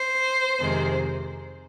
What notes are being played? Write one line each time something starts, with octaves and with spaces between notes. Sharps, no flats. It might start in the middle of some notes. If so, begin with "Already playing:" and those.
Already playing: C5
F2 C3 D#3 G#3